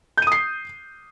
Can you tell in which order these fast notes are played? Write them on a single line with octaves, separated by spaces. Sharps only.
G6 D#7 D#6 C7